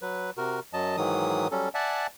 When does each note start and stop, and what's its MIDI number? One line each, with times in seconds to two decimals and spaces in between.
0.02 0.30 54
0.02 0.30 71
0.37 0.60 48
0.37 0.60 66
0.37 0.60 70
0.73 0.96 42
0.73 0.96 54
0.73 0.96 75
0.73 0.96 81
0.97 1.48 44
0.97 1.48 51
0.97 1.48 52
0.97 1.48 54
0.97 1.48 87
1.51 1.69 54
1.51 1.69 55
1.51 1.69 61
1.51 1.69 69
1.74 2.07 74
1.74 2.07 76
1.74 2.07 78
1.74 2.07 80
1.74 2.07 81